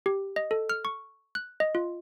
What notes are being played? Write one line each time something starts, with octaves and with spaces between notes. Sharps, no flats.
G4
D#5
A4
F6
C#6
F#6
D#5
F4